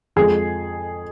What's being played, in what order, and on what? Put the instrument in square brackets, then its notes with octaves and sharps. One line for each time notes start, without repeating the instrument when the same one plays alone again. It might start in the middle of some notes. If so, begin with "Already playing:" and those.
[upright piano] F2 F3 G#3 G#4